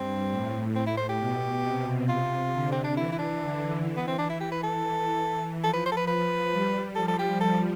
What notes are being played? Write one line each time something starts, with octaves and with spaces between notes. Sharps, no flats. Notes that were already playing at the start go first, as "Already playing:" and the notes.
Already playing: G2 C4
A2
A2 C4
E4
C5
G4
B2
C3
F4
D3
C4
D4
E3 E4
E4
D4
D3
E3
B3
C4
D4
E4
G4
B4
A4
E3
F3 A4
B4
C5
A4
B4
B4
G3
F3 A4
A4
G4
A4